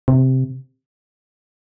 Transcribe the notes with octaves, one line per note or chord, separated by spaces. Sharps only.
C3